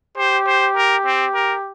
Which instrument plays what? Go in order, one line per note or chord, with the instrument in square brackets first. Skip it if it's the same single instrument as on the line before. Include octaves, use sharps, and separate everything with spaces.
[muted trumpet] G4 [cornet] C5
[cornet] C5
A#4
C4
A#4